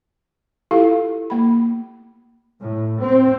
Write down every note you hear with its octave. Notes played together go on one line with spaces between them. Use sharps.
E4 F4 G4 A4 F5
A#3 B5
A2
C4